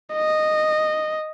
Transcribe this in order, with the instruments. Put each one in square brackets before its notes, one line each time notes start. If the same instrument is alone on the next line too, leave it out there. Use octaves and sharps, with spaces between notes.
[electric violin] D#5